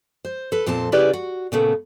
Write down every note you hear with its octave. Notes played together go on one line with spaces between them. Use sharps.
C5
A4 B4
F2 A#2 C4 C5 A5
C#3 E4 G4 G#4 B4 D5
F#4
A#2 C#3 A3 B3